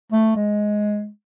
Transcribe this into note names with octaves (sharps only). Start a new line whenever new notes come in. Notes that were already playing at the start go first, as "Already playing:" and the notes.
A3
G#3